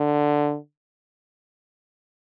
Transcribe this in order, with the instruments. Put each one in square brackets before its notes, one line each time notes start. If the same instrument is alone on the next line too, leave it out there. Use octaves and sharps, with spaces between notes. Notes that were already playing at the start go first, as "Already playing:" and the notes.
Already playing: [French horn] D3